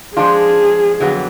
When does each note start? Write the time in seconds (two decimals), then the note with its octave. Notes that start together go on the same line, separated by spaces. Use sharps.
0.16 F3 G#3 D4 F4 G#4
1.00 F2 D3 F#3 B3